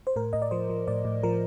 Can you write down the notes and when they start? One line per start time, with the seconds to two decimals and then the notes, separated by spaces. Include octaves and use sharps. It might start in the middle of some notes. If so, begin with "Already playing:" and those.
0.07 C5
0.16 A2 A#4
0.33 A2 D#5
0.42 D5
0.51 F3 C5
0.70 F3
0.88 A2 D5
1.05 A2
1.23 F3 A#4